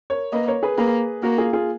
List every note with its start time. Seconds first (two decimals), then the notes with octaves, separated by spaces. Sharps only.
0.10 A#4 C#5
0.32 A#3 B4 D#5
0.48 A#4 C#5
0.63 G#4 B4
0.78 A#3 G#4 B4
1.23 A#3 F#4 A#4
1.38 F4 G#4
1.53 F4 G#4